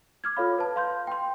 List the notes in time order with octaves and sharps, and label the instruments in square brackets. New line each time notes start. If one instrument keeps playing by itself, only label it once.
[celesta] D6 F6 G#6
F4 A4 C#5 F5 B5
B4 A5
F5 C6 G6
G5 C6